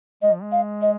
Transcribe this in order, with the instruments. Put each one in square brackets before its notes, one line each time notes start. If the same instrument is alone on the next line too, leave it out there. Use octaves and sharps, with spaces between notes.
[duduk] G#3 [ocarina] D#5
[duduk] F3
G#3
[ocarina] F5
D#5